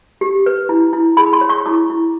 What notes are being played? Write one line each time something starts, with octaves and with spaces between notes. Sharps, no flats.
G4
B4
E4
E4
G#4 B5
C6
C#5
C#6
E4 D6
E4